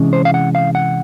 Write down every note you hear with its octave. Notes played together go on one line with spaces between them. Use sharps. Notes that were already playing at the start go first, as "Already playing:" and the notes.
Already playing: C3 E3 G#3 C#4
C5
F5
F#5
F5
F#5